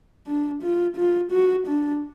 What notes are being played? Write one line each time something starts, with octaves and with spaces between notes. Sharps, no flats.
D4
F4
F4
F#4
D4